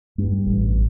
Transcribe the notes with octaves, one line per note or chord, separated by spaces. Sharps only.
G2
A1